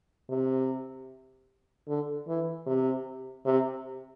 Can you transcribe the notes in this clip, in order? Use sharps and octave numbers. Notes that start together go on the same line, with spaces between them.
C3
D3
E3
C3
C3